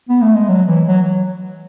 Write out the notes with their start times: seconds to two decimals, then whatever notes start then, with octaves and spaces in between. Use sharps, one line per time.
0.09 B3
0.22 A3
0.35 G#3
0.49 F#3
0.68 E3
0.86 F#3